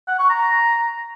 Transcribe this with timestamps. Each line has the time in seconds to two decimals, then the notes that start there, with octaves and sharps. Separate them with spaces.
0.08 F#5
0.19 C#6
0.30 A#5